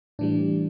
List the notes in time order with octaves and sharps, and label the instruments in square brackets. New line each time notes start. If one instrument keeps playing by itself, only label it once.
[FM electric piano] A2 E3 G3 D4